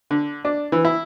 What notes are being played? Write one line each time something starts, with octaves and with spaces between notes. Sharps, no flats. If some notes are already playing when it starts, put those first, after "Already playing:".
D3
D4
E3
E4